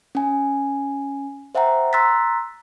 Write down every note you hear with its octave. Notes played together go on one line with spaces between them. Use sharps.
C#4 G#5
C5 E5 F#5 G5 A#5
A#5 C6 E6 F#6 A6 B6